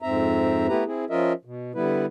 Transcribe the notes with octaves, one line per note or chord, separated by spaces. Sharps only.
F2 G#2 C4 E5 A#5
A3 B3 E4 G4 B4 A#5
C4 E4 G#4
F3 C#4 F4 A#4 D#5 E5
B2
D3 G3 B3 E4 B4